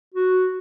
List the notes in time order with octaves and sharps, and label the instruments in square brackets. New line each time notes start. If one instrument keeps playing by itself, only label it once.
[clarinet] F#4